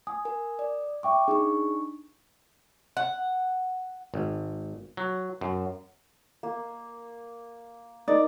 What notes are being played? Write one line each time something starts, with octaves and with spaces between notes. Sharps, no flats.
G#5 D#6
A#4 G#5
D5
E5 G5 C#6 D6
D4 D#4 G#4 C#6
F#5
G#1
F#3
F#2
A#3
D#4 A#4 D5